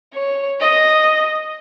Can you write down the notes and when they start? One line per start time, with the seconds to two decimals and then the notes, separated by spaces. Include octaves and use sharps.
0.14 C#5
0.60 D#5